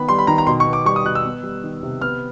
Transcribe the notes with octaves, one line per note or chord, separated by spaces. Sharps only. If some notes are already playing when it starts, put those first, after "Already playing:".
Already playing: D#3 B3 B5
G3 C6
B5
D#3 A#5
A#5
B2 C6
C#6
B3
D6
G3 C#6
D#6
B2 F#6
E6
B3
G3
D#3
C3
B3 F6